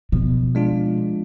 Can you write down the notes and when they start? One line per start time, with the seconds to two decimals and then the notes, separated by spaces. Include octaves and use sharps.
0.12 B2 F3
0.55 G#3 D4 F4